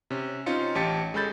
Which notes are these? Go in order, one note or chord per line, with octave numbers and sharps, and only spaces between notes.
C3 C#4
C4 C#4 D#4 F4 C6 C#7
A1 G4 A5 A6 B6 C#7
G#3 C#4 A4 B5 G6 A6